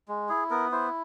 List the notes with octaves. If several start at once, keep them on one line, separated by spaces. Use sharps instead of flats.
G#3
E4 G#4
B3 A#4
E4 C5